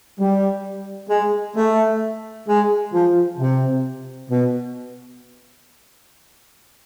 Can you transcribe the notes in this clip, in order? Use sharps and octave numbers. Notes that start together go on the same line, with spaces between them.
G3
G#3
A3
G#3
F3
C3
B2